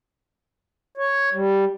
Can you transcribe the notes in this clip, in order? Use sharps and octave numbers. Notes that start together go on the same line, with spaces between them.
C#5
G3